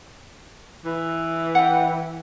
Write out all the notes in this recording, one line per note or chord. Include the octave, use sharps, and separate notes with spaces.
E3
F#5 G5